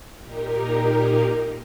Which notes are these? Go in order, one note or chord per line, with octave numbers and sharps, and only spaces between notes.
A#2 A#3 D#4 G4 A#4